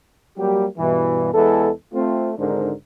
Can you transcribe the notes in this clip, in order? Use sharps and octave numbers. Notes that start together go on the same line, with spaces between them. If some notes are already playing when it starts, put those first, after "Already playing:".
F#3 G3 A#3 G4
G2 B2 E3
E2 E3 G#3 A4
A3 C4 F4
G#1 G#2 D3 D4 A#4 C5